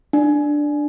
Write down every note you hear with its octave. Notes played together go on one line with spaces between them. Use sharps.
D4